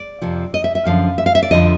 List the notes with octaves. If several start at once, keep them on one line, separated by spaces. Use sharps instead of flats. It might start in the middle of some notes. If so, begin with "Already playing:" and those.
Already playing: D5
F2 C3 F3
D#5
E5
E5
F#2 D3 F3 F5
E5
F5
E5
D5
F2 D3 F3 D#5